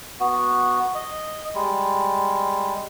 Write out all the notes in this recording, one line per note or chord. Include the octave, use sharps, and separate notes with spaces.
B3 F#4
D#5
G3 G#3